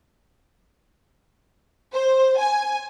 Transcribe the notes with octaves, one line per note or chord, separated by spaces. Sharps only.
C5
G#5